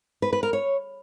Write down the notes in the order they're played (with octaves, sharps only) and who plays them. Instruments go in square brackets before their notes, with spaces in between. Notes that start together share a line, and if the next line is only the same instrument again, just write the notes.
[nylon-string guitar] B4
B4
A#4
C#5